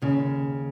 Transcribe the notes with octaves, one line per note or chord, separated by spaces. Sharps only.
D#2 C#3